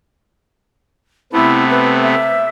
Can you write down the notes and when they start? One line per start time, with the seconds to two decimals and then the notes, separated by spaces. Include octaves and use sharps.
1.33 C3 A3 B3 E4
1.70 B4
2.02 E5